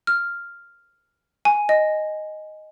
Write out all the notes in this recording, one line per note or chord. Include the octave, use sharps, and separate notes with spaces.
F6
G#5
D#5